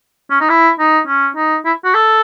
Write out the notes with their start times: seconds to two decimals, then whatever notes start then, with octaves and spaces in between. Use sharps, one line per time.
0.30 C#4
0.40 D#4
0.49 E4
0.79 D#4
1.07 C#4
1.36 D#4
1.65 E4
1.84 F#4
1.94 A4